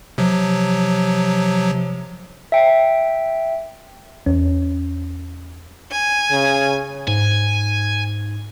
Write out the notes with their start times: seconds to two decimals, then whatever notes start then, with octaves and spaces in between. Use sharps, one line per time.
0.18 C3 F3 F#3
2.52 E5 G5
4.26 E2 C#4
5.91 G#5
6.31 C#3
7.08 G#2 G#5